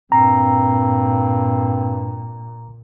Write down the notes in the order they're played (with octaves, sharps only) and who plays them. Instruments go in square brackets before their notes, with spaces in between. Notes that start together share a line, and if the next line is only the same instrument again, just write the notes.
[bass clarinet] G2 [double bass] A#2 [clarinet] C4 [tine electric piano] A#5